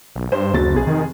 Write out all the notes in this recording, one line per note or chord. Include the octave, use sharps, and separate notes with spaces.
B1
G2 C5
F#1 D2 F#3 A6
F1 B1 G#4
D#3